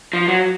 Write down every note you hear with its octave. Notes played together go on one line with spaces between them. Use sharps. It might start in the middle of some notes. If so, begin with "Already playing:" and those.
F3
F#3